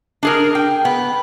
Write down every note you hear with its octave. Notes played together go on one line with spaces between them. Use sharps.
D4 G#4 A#4
G5
B3